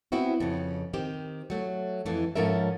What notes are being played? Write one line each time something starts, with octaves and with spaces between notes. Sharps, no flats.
B3 C4 E4 F#4
F2 C#3
D#3 C4 G4
F#3 A3
F2 E3 A3
G#2 F3 C#4 A4 A#4 E5